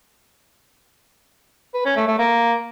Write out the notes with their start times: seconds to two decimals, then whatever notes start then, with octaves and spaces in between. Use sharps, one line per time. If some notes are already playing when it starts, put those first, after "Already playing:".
1.74 B4
1.85 C#4
1.96 A3
2.08 A3
2.19 A#3